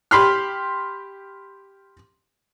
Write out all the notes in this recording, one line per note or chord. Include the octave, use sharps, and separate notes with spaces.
G4 B5 C6 F6